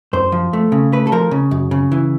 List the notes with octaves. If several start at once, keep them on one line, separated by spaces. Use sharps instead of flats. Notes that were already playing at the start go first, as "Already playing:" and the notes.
F#2 C5
F3
A3
C#3
A3 B4
A4
F3 A#4
C#3
F#2
C#3
E3